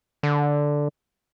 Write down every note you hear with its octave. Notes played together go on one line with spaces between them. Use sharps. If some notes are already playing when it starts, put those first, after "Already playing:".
D3